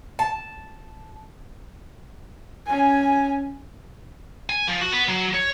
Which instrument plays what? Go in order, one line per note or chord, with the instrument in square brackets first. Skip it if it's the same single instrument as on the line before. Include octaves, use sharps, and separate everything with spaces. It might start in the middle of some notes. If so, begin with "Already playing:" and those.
[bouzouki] A5
[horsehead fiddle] C#4 G#5
[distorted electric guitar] G#5
F3
F#4
B3
F#3
C#5